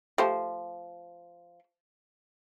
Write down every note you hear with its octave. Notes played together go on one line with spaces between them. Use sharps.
F3 A3 G4 C5